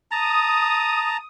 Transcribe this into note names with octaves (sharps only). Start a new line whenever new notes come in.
A5 A#5 D#6